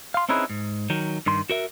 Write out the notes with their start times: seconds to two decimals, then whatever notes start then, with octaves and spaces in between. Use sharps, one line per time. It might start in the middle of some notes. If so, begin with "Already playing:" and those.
0.14 F5 C6
0.29 C4 C#4 D#4 E4 G#4 B4
0.50 G#2
0.90 D#3 F#3
1.26 G2 D#3 C6
1.50 F#4 A#4 E5